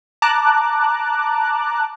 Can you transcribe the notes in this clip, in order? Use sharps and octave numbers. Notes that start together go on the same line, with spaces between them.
A5 A#5 D6 F#6